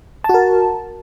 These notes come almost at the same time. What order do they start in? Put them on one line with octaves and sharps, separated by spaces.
A5 F#4 A#4